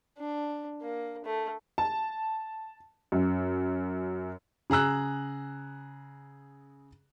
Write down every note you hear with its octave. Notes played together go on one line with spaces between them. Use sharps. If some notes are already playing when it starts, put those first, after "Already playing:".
D4
A#3
A3
A5
F#2
C#3 G#4 A#5 E6 F#6